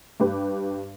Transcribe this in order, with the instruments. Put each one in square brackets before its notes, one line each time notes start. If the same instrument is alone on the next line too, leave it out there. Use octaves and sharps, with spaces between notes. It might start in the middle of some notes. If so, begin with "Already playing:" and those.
[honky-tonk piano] G2 G4 B4